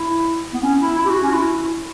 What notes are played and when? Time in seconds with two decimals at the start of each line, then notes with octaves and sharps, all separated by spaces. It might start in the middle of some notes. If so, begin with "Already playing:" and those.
Already playing: E4
0.54 B3
0.63 C#4
0.81 E4
0.98 E4
1.05 G4
1.10 F#4
1.23 C#4
1.30 F#4
1.34 E4